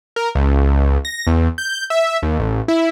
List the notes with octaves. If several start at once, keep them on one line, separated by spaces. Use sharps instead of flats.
A#4
C#2
A#6
E2
G6
E5
D#2
A1
E4